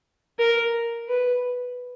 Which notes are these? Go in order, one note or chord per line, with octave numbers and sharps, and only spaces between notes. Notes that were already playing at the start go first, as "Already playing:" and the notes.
A#4
B4